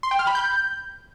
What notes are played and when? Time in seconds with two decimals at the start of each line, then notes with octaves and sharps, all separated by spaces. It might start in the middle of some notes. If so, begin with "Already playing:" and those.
0.03 C6
0.11 G5
0.19 F6
0.27 B5
0.35 G6